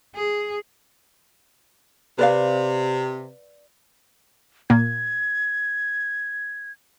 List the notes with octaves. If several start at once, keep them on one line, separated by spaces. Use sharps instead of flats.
G#4
C3 B4 D5 F5
A#2 A#3 G#6